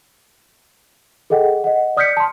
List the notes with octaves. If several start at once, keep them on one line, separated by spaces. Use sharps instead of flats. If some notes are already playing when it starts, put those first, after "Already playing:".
G#4 A4 D#5 F#5 G5
D#5 F#5
D5 D#6 F6 G6 B6 C#7
A5 C6